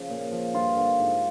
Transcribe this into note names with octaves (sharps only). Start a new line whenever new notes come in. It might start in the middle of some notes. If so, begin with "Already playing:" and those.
Already playing: C#3 F3
A#2
F3
G2 F4
D3 F3
G#2